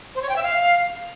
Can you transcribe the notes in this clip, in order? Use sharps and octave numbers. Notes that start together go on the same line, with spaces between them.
C5
C#5
G5
E5
F5